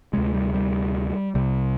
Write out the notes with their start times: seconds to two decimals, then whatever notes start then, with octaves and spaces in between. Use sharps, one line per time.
0.13 D2 C3 G#3
0.34 G3
0.54 G3
1.35 C2 C3 G3